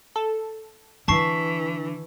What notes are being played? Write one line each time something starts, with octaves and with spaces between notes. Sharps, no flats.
A4
D3 E3 A5 C#6 C7